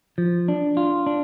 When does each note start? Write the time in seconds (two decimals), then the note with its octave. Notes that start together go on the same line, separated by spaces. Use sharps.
0.18 F3
0.48 D4
0.77 F4
1.07 D4